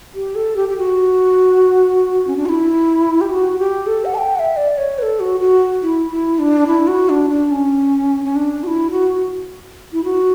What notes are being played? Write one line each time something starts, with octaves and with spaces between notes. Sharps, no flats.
G4
A4
G4
G4
F#4
C#4
D4
F#4
E4
G4
F#4
G4
A4
F#5
A5
G5
F#5
E5
D5
C#5
B4
A4
F#4
F#4
E4
E4
D4
E4
F#4
D4
D4
C#4
C#4
D4
F#4
E4
F#4
E4
F#4